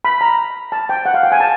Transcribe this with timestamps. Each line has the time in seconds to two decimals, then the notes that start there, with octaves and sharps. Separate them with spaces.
0.05 B5
0.21 A#5
0.72 A5
0.89 G5
1.06 F#5
1.14 F5
1.23 G5
1.32 G#5
1.40 A5